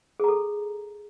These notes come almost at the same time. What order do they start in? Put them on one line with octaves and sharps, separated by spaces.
G#4 A#5 A4